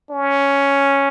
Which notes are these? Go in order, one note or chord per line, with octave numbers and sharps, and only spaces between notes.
C#4